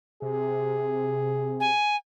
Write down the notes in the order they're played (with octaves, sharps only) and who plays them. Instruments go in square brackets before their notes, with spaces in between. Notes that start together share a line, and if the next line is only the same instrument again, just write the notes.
[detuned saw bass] C3 [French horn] G#4
[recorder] G#5